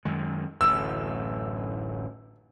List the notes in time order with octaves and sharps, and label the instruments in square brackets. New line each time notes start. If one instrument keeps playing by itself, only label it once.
[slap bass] F#2 D#3 G#3
[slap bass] D1 A1 F#2 [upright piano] E6